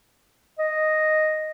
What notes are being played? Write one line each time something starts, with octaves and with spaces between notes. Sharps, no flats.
D#5